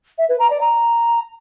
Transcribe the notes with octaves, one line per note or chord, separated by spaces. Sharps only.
E5
B4
A#5
D5
A#5